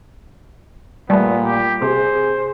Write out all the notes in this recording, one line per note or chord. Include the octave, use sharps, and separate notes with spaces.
A#2 G3 A3 B3
G4
C3 G#4 C5